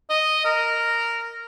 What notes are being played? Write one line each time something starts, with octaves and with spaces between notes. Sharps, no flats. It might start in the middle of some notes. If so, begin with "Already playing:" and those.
D#5
A#4